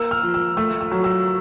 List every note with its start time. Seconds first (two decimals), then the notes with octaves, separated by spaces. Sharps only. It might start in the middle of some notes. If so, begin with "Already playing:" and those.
Already playing: A#3 E6
0.11 F6
0.23 F3
0.34 E6
0.57 A3 E6
0.81 E6
0.92 F#3
1.04 E6